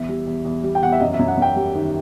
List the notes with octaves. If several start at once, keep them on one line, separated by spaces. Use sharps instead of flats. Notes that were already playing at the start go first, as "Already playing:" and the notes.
Already playing: E2 E5
G3
E2
E2
G3
G5
E2 F#5
E5
F#2 D#5
E5
F#2
F#5
F#2 G5
G3
D#3